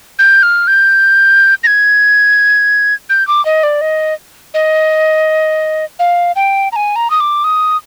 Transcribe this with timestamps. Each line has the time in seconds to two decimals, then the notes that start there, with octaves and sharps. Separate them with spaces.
0.19 G6
0.43 F6
0.67 G6
1.64 A#6
1.67 G#6
3.10 G6
3.27 D6
3.45 D#5
3.63 D5
3.81 D#5
4.54 D#5
5.99 F5
6.36 G5
6.72 A#5
6.76 G#5
6.96 A#5
7.10 D#6
7.20 D6
7.44 D#6